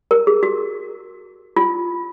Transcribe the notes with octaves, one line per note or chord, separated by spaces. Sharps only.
A#4
G#4
F#4
F4